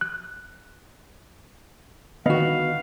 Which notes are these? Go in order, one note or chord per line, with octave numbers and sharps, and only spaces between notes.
F#6
D3 D#3 B3 F#4 D#5 F5